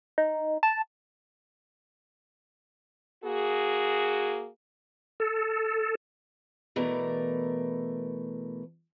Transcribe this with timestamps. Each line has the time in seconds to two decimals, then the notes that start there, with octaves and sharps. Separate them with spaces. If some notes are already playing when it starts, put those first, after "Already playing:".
0.18 D#4
0.63 A5
3.24 A#3 F#4 G#4
5.20 A4
6.76 B2 E3 A3 A#4 D5 A#5